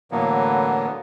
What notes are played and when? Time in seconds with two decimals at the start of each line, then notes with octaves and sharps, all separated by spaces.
0.11 A2 D3 E3 F#3 A#3 B3